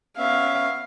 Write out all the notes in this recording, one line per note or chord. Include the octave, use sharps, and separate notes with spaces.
B3 C#4 E5 F5